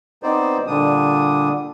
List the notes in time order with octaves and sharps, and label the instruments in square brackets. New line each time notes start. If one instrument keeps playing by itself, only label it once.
[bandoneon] B3 C4 D#4 C5 D5
A#2 D3 G3 D4 D#6